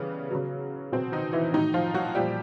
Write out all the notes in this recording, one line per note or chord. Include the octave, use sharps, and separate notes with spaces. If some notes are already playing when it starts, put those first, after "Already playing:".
Already playing: C#3 E3 G3 B3
C#3 F#3
B2 F#3 C4
D#3 D#4
E3 E4
A2 D#3 F#3 D#4
F3 F4
F#3 F#4
A#2 F3 G3 G4